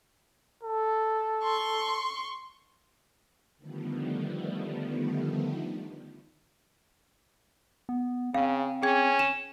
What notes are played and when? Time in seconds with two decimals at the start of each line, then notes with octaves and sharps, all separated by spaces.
0.63 A4
1.43 C6 C#6
3.57 D3 D#3 F3 G3 A3 B3
7.89 B3
8.34 C#3 C4 F5
8.83 C#4 G#4 G5 G#6
9.19 E7